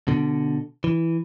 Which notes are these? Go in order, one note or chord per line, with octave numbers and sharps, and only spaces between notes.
B2 D3
E3